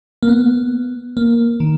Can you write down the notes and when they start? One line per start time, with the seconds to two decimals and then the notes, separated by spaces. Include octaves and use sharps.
0.23 A#3
0.29 B3
1.17 A#3
1.60 D#3